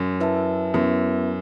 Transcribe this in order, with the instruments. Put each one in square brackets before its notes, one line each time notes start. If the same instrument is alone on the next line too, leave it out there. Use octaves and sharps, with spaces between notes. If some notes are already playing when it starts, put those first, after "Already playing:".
Already playing: [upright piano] F#2
[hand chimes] E4 B4 E5 A5
[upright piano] F#2 [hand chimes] B3 E4 B4 E5